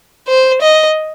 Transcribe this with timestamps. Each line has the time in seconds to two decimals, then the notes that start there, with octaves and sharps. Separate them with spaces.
0.28 C5
0.62 D#5